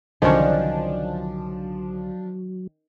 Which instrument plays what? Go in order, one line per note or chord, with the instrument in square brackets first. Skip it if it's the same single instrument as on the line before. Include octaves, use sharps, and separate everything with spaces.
[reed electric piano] C2 D3 [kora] D#3 C#4 C#5 [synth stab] F3 D4 [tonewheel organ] F#3